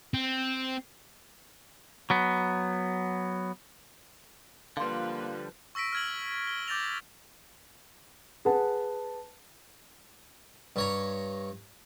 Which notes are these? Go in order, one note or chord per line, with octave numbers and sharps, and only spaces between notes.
C4
F#3 B3
D3 F3 G3 A#3 B4 F5 C6
C#6 E6 A#6 B6 D7
F6 G#6 F#7
G7
D6 G6 A6 A#6 F7 G7
G#4 B4 F#5 A5
G2 C#5 A#5